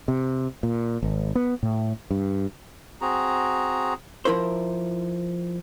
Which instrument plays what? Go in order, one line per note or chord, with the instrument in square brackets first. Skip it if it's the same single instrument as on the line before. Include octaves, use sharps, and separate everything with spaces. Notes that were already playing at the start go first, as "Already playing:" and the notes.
[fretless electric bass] C3
A#2
G#1
B3
A2
G2
[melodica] C4 F#4 G#4 A#5
[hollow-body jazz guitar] F3 E4 A#4 C5